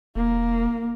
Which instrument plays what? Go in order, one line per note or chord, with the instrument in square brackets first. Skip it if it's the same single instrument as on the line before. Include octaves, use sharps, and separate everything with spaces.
[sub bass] E1 [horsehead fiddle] A#3